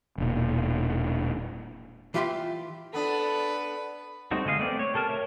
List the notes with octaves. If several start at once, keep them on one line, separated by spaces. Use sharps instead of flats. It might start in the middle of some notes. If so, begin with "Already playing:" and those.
E1 A#2
E3 F4 G4 E5 C6
B3 D4 A4 B4
G3 A3 C4 D#4 F#4
D3 G#3 D#5 F5
A3 B3 C4 D5
C#5
G4 A4 A#4 A5 F6
A#4 C#5 E5